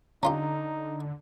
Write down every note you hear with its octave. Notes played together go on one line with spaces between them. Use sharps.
D3 C#4 D#4 F4 G4 A#5